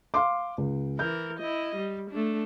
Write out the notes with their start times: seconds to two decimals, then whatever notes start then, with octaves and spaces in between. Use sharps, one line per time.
0.14 F5 C6 D6
0.58 C#2
0.99 E3 A#4 G6
1.39 E4 D#5
1.76 G3
2.11 A3 D4